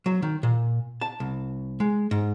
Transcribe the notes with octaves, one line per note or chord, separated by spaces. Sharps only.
F#3
D#3
A#2
A5
C2
G#3
G#2